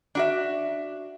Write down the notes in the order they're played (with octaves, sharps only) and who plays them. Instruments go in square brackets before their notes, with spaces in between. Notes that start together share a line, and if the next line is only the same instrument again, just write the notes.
[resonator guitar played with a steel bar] D4 F#4 E5